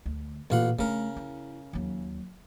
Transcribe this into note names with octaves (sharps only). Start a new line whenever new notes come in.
D2
A1 A#2 F4 F#5
C#3 A3 D4 A#4
E4
D#2 F#3